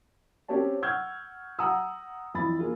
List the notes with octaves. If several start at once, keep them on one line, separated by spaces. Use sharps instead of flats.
C4 C#4 G4 C5 C#5 A5
F#5 C#6 E6 F6 G6 G#6
F#5 A#5 D#6 E6
F2 E3 B5 A6
A#3 F4 G#4